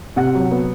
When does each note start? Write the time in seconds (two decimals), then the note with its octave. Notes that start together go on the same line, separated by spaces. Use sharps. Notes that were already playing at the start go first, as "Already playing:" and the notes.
0.16 C3 F#5
0.35 F#3
0.51 B3